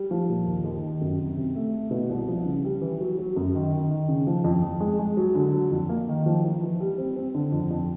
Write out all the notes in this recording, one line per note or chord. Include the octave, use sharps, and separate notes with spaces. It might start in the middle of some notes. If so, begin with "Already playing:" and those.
Already playing: G3
F3
A#2
D#2
D#2
D#3
F#2
C3
C3
A3
A3
B2
C2
F3
C#3
G3
E3
F#3
F#3
F#2
D#3
D#3
D#3
C#3
F3
F2
F2
G#3
G#3
F#3
D3
F#3
F2
A#3
D#3
F3
F3
E3
G3
C4
C4
D3
F2
F2